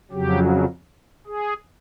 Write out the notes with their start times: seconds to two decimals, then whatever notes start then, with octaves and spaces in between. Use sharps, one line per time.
0.11 F2 C#3 F#3 G4
1.27 G#4